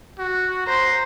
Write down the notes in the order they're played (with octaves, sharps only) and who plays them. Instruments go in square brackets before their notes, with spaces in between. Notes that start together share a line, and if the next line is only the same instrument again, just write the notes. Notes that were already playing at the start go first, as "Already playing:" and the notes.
[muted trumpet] F#4
[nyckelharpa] C5 [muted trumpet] A#5